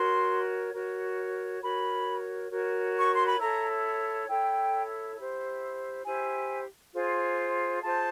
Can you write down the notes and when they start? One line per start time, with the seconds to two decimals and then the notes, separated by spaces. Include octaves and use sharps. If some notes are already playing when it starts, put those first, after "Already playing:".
Already playing: F#4 A#4 C#5 C6
0.73 F#4 A#4 C#5
1.62 F#4 A#4 C#5 B5
2.50 F#4 A#4 C#5
2.98 C#6
3.11 C6
3.25 B5
3.39 E4 A4 C#5 A#5
4.27 E4 A4 C#5 G5
5.16 E4 G4 C5
6.04 E4 G4 C5 G#5
6.94 F4 G#4 C5
7.82 F4 G#4 C5 A5